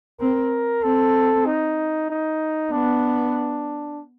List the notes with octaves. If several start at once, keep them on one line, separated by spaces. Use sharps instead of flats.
C4 A#4
C4 A4
D#4
D#4
B3 D4